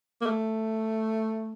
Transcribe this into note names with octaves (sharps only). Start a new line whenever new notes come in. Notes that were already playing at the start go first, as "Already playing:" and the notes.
A#3
A3